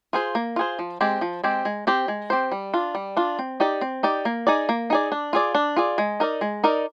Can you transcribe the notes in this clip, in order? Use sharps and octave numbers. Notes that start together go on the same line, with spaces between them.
F4 G#4 C5
A#3
F4 G#4 C5
F3
G#3 C4 G4
F3
G#3 C4 G4
G#3
C4 G4 C5
G#3
C4 G4 C5
G3
D4 F4
G3
D4 F4
C4
D#4 G4 D5
C4
D#4 G4 D5
A#3
D#4 G#4 D5
A#3
D#4 G#4 D5
D4
F4 G#4 D5
D4
F4 G#4 D5
G#3
D#4 A#4 D5
G#3
D#4 A#4 D5